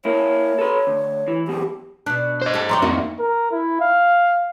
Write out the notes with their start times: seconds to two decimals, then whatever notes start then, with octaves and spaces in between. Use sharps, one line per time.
0.05 A#3 E4 C#5
0.59 A4 B4
0.87 D2
1.28 E3
1.48 B1 E2 B2 G4
2.06 B2 D4 F#6
2.42 C5 D#5
2.54 G4 A4
2.69 F#3 D4 G4 A#5 C6
2.82 F2 D#3 A#3 D4 F#4 E5
3.19 A#4
3.51 E4
3.81 F5